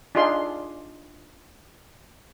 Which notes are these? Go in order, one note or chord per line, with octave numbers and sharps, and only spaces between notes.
D4 D#4 F4 G#4 C6